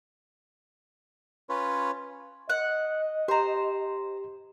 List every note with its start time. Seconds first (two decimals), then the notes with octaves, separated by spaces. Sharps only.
1.49 C#4 F4 B4 C#5
2.50 D#5 F#5
3.28 G4 C5 A#5